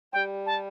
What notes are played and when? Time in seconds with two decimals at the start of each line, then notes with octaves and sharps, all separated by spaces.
0.13 G3 G5
0.46 A5